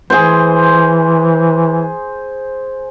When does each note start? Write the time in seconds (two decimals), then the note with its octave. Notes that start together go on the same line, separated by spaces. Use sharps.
0.10 E3 G#4 C5